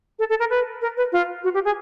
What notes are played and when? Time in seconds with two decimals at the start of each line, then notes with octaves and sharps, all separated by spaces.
0.19 A4
0.29 A4
0.39 A#4
0.50 B4
0.81 A#4
0.97 B4
1.12 F4
1.43 F#4
1.54 G4
1.65 G#4